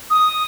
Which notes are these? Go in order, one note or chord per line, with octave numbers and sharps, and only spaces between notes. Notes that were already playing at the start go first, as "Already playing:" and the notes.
D#6